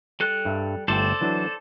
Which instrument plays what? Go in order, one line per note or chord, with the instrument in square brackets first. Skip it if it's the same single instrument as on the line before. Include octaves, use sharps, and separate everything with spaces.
[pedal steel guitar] G3 A4 F#6
[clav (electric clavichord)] G2 E5
[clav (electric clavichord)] G1 A3 G5 [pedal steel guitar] A4 C5 D5
[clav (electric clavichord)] E3 F#3 D4